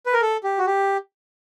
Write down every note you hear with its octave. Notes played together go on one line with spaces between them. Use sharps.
B4
A#4
A4
G4
F#4
G4